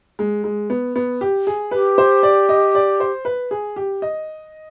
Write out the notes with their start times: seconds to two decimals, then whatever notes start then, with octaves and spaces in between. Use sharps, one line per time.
0.19 G#3
0.44 G#3
0.70 B3
0.96 B3
1.21 G4
1.47 G#4
1.71 G4 B4
1.98 C5
2.23 D5
2.49 D#5
2.75 D5
3.00 C5
3.25 B4
3.51 G#4
3.76 G4
4.02 D#5